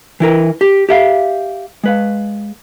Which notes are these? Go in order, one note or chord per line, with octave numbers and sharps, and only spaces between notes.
E3 E4 A#4 B4
G4
G4 E5 F5
G#3 B4 F5